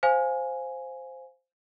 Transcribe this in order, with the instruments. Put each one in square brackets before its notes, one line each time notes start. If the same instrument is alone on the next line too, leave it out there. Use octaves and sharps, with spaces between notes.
[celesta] C5 F5 G#5